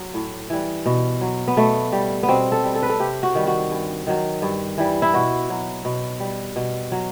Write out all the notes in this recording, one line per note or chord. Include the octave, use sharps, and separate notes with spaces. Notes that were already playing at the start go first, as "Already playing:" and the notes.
Already playing: F#3
A2
E3 G3
B2
F#3
B3
B2 A3
G3
B3
B2 C4
A4
G3
A4
B4
A4
C3 G4
F#4
D#3 G3
F#4
G2
D#3 F#3
G2
E3 G3
E4
B2 F#4
F#3
B2
G3
B2
F#3